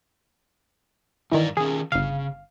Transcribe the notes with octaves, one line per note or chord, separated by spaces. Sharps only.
G2 D#3 E3 A#4 D5
D#3 C#4 G#4
G1 C#3 F5